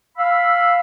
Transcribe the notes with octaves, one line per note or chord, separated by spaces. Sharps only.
F5 B5 E6